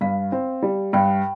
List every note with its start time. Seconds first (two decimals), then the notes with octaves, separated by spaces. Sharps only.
0.01 G2 F5
0.32 C4
0.62 G3
0.93 G2 G5